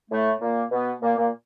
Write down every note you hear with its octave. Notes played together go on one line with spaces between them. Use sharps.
A2 A3
A#2 A#3
B2 B3
A#2 A#3
A#2 A#3